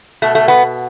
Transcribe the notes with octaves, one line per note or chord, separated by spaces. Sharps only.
B2 A3
A3
B3